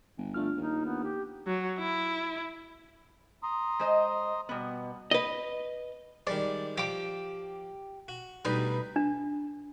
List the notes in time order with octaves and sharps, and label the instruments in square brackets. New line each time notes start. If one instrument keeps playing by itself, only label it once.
[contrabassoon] G1
[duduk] A3 [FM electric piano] D4 F4 F6
[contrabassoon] D#2 [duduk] D#4
[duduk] B3
G4
[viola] F#3
E4
[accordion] A#5 C6 D#6
[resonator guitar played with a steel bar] G#3 C5 D#5
[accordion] B2 [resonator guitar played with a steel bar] G3 B3
[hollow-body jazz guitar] B4 D#5
[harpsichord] D#3 G3 G#3 [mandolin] D5
[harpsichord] F3 [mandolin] G4 D6
[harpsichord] F#4
[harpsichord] D2 B2 G3 [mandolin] D#4 B4
[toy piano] D4